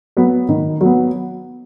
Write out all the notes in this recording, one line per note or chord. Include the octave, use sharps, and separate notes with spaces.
F#3 B3
D#3
F#3 B3